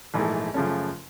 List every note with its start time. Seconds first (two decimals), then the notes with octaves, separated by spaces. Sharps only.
0.14 A#1 G#2 E3 A3
0.54 F#2 C#3 F3 A3 C#4